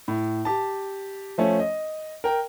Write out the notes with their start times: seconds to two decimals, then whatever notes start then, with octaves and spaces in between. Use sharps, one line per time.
0.08 A2
0.45 G4 A5
1.38 F3 A3 C#4
1.60 D#5
2.24 A#4 G5